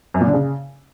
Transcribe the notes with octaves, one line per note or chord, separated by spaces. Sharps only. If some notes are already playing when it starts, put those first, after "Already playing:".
F#2
A#2
D3
C#3